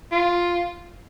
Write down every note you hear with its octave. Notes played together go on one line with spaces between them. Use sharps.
F4